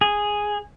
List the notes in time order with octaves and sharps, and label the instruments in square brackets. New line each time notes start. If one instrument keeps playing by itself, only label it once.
[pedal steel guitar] G#4